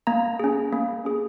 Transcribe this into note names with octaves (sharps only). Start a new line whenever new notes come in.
A#3 A#5
C#4 G#4
A#3
C#4 G#4